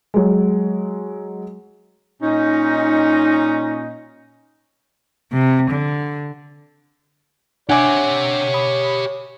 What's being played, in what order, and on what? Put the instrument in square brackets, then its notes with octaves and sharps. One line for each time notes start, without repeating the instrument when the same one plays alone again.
[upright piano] F#3 G#3
[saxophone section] A#2 C#4 D#4
[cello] C3
D3
[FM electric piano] D4 [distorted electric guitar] G4 E5 [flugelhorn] C#5 [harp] F#5 G#5 D6
[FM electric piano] B5 D#6